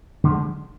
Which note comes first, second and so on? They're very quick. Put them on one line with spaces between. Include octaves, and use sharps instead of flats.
D3 F3 G#3